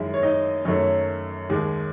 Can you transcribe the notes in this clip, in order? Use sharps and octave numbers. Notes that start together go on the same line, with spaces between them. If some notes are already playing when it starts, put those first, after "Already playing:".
Already playing: F#2 D#3 G#3 E4 E5
C#5
D#4 D#5
F#2 D#3 F#3 A3 C#4 C#5
D#2 D#3 G#3